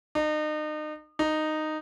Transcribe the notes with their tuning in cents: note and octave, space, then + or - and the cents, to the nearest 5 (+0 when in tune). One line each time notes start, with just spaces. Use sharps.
D#4 -35
D#4 -10